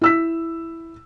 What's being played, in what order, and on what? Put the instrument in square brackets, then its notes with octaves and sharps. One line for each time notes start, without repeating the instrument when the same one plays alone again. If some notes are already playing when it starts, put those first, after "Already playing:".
[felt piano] E4 E6 B6